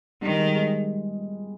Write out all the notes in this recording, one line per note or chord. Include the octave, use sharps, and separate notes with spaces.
D#3 G3
G#3
G#3